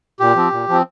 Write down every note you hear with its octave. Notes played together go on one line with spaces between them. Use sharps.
A#2 G4
F3 C4
A#2
F3 C4